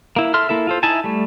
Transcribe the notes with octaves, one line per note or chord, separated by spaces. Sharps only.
A#3 E4
A4 E5 C6 F6
A#3 E4 A4 E5
F4 A4 C5
D#4 E4 E5 G#5 A5
G3 A3